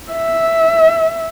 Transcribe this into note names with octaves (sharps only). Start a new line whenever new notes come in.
E5